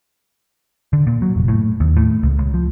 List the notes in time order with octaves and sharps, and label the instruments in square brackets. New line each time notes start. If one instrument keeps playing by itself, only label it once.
[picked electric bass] D3
A#2
F#3
F1
A2
D#2
A2
C#2
C#2
F3